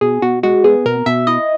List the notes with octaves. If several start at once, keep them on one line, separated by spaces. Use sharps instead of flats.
B2 G#4
B2 F#4
G#3 F#4
B3 G#4
B2 A#4
B2 E5
E4 D#5